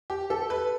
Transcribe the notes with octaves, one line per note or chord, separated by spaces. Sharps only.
G4
A4
B4